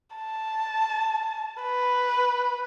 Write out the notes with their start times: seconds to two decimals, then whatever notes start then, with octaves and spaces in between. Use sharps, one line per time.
0.16 A5
1.62 B4